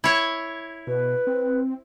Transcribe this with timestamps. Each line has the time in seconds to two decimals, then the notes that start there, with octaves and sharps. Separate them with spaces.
0.04 E4 C#5
0.87 B2 B4
1.27 C4